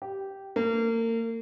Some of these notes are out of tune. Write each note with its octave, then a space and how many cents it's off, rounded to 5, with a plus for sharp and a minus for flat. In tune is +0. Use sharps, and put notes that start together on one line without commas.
G4 -10
A#3 -35